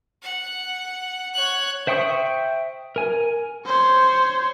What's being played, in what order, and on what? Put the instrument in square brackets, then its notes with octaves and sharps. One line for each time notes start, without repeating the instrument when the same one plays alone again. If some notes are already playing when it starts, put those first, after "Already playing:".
[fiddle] F#5
C#5 F#6
[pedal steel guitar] C5 E5 G5 C#6 D#6
A#4 G#5
[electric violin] C5 C#5